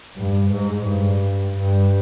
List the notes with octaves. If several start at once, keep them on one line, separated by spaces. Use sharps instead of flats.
G2
G#2
G2
G2